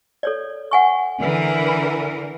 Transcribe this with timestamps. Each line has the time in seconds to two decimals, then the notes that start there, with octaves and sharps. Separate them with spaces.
0.23 A4 C#5 D5
0.71 F#5 G#5 C#6
1.21 D3 E3 A#4
1.68 B5